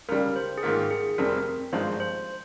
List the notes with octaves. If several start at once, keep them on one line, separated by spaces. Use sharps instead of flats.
C#2 C#3 G3 A#4
C5
G#4
G#2 D#3 A#3 F4 A#4
G#4
F1 F2 C3 G3 C4 A#4
G#1 G2 F3 G#3 C5
C5